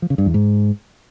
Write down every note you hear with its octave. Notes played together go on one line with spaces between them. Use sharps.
F3
C#3
G2
E2
G#2